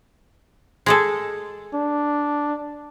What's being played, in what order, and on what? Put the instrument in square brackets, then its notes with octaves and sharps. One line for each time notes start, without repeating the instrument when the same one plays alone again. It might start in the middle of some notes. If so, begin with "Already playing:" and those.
[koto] G#3 G#4 A4
[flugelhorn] D4